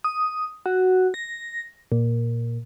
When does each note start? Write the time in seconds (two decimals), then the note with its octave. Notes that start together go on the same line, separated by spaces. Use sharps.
0.04 D#6
0.66 F#4
1.14 A#6
1.92 A#2